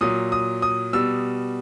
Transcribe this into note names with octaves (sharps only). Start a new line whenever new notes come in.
A#2 F#3 D#6
D#6
D#6
B2 G3 E6